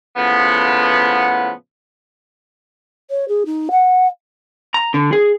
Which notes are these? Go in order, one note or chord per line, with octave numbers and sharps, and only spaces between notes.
A2 C#3 F3 B3
C#5
G#4
D#4
F#5
A#5
D3
G#4